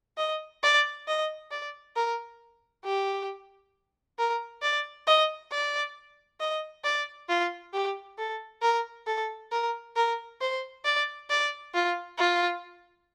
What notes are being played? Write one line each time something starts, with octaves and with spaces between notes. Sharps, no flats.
D#5
D5
D#5
D5
A#4
G4
A#4
D5
D#5
D5
D#5
D5
F4
G4
A4
A#4
A4
A#4
A#4
C5
D5
D5
F4
F4